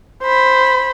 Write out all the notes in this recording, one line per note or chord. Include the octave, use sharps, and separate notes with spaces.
C5 B5